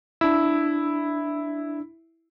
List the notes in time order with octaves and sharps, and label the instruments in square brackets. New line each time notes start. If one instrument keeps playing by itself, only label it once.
[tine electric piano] D4 E6 [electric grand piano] E4